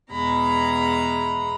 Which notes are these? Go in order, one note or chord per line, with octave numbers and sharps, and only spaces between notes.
E2 B2 G#3 A#5 B5